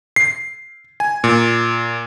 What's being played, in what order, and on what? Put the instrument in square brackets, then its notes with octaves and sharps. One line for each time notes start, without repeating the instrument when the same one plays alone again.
[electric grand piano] C7
G#5
A#2